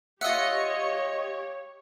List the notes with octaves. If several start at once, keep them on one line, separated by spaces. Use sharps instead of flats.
F4 G4 C#5 D#5 E5 F#5 E6 C#7